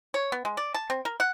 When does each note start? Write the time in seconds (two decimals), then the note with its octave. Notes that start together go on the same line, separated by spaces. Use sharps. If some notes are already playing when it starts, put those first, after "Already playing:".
0.14 C#5
0.32 B3
0.45 G#3
0.57 D5
0.74 A5
0.90 C4
1.05 A#4
1.20 F#5